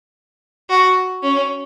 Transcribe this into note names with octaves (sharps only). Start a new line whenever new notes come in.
F#4
C#4